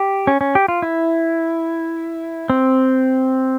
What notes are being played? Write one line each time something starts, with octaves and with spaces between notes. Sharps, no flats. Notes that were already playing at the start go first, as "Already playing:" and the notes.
Already playing: G4
C#4
C#4
G4
F4
E4
C4